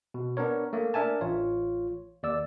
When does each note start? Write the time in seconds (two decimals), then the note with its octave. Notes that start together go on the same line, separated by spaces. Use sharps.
0.14 B2
0.37 B3 D4 A#4 C#5
0.73 A3 A#3
0.94 D4 A#4 E5 G#5 A5
1.21 A1 F4 C#5
2.23 D#2 D5 E6